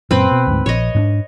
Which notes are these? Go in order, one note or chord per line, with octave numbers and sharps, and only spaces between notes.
F#2 A#2 C4 B4
B2
D2 G#2
A#1 C#5 D#5
G#2 B3 D4